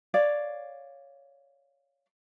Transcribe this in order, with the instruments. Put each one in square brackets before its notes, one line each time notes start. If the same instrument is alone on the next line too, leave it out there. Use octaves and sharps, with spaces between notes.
[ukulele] C#5 D5 F5